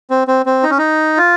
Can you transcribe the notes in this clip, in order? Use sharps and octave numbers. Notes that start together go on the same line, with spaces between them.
C4
C4
C4
D#4
C#4
D#4
F4